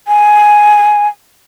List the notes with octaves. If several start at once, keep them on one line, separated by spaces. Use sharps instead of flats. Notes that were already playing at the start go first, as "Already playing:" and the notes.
G#5